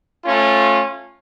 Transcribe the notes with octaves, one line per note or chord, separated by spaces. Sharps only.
A3 C#4 F4